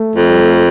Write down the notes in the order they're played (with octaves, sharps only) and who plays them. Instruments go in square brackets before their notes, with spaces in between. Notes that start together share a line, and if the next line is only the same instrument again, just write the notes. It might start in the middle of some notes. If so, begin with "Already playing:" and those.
Already playing: [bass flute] A3
[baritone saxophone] F2
[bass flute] G3
A3